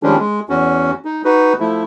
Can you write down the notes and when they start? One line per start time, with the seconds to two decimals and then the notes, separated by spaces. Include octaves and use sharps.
0.03 D#3 F3 G3 G#3 C#4 D4
0.19 G#3
0.49 E2 C#4 F#4
1.05 D#4
1.25 D#4 F#4 B4
1.60 F3 A3 E4